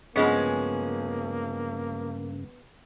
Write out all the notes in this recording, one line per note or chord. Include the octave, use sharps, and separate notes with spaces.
G2 C#3 F3 G#3 A#3 B3 C#4